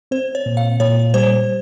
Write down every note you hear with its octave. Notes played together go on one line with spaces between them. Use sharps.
C4 C5
C#5
A#2
F5
A#2 C#5
G3 C5